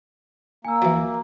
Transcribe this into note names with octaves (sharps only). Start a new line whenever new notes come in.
A#3 G#5 E6
E3 F#3